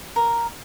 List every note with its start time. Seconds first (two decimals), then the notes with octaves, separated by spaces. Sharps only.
0.16 A#4